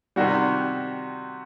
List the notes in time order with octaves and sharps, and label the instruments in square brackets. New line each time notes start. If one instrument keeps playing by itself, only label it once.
[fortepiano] C3 D#3 G3 [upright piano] F#4